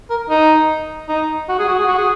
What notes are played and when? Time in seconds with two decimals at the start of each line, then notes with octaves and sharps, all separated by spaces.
0.10 A#4
0.30 D#4
1.08 D#4
1.49 F#4
1.59 G#4
1.68 F#4
1.79 G#4
1.88 F#4
1.98 G#4